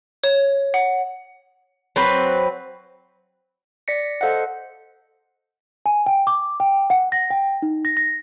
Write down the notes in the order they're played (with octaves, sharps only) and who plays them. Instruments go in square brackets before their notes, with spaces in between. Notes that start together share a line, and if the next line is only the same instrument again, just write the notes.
[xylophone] C#5
F#5
[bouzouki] F#3 C4 B4
[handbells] D5 A#6 B6 C#7
A4 C5 D#5 F5 F#5
[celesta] G#5
G5
D6
G5
F#5
A#6
G5
D#4
A#6
A#6